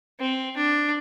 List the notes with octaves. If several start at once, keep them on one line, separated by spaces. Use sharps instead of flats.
C4
D4